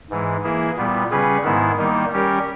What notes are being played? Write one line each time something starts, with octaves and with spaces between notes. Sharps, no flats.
G#2 E3 G#3
E3 A#3 E4 G#4
A#2 G3 B3
C#3 G3 C#4 G#4 B4
G#2 D#3 G#3 B3 E4
D#3 G3 A#3 D#4
G3 C#4 G4 A#4